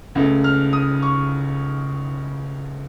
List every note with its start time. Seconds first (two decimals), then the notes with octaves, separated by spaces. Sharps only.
0.15 C#2 C#3 A3
0.44 F6
0.73 D#6
1.03 C#6